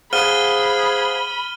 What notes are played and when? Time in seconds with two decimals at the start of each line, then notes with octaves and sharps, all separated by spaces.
0.13 G#4 C5 F5 F#5 B5 F6 D#7 G7